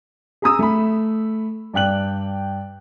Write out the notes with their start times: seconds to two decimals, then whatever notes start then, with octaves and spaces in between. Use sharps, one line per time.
0.42 G#4 A#5 D#6 E6
0.59 A3 B5
1.74 G2 D5 G5 F#6 F#7